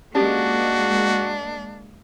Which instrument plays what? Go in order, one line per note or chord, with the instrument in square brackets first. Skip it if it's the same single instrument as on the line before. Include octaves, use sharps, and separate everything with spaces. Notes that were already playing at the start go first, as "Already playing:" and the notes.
[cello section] G#3 A#3 [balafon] C#4 G4 [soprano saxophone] D4 [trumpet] F#4